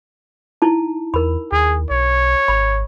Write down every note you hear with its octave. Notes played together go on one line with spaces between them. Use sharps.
D#4 E4 A5
E2 A#4 B5
D#2 G#4
B1 C#5
G#1 B5